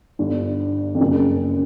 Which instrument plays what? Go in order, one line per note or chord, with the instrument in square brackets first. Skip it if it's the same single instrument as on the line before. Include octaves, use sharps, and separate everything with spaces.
[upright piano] G1 G2
F2
F#1 F#2